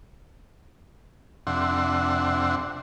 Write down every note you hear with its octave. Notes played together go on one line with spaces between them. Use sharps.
F2 C3 D4 E5 F#5 C6